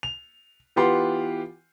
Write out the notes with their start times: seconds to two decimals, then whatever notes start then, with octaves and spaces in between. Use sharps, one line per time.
0.03 F7
0.76 E3 B3 F4 G4 F#5 C6